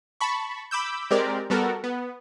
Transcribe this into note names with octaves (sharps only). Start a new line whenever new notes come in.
A5 B5 C#6
B5 D6 E6 G6
G#3 C4 G4 A#4 D5
G3 B3 F#4 A4 A#4
B3